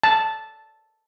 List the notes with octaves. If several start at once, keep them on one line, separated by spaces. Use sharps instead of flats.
A5